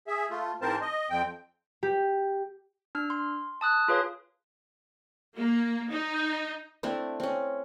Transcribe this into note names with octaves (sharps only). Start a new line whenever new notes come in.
G#4 E5
A3 F4
G#2 E3 C4 A#4 C5 A5
D#5
F2 C4 G5
G4
D4 F6
C6
A5 D#6 F#6
F4 G#4 B4 C#5 F5
A#3
D#4
A3 C4 D4 E4
C4 C#4